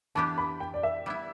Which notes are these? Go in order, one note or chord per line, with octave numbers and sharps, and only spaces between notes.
E3 B3 D4 G4 A5
B5
G5
D5
E5
G3 B3 E4